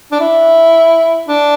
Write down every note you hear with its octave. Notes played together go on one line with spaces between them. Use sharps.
D4
E4
D4